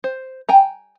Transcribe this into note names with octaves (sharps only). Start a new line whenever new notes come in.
C5
G5 G#5 A#5